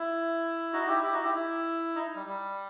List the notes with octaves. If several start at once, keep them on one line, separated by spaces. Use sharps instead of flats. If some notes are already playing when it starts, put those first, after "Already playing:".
Already playing: E4
D#4 F#4
E4 G4
E4 G4
D#4 F#4
E4 G4
E4
D#4
G3
G3